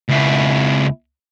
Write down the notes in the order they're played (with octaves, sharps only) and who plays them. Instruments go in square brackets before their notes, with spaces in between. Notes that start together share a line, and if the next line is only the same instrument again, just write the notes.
[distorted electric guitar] C#2 E4